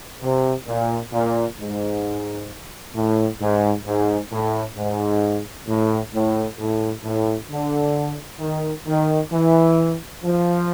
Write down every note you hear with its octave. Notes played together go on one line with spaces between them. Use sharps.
C3
A#2
A#2
G#2
A2
G#2
G#2
A2
G#2
A2
A2
A2
A2
D3
D#3
D#3
E3
F3